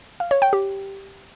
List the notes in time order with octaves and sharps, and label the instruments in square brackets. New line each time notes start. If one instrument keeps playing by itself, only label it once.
[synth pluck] F5
C#5
G5
G4